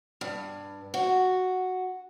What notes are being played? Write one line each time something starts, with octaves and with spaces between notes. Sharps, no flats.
G2
F#4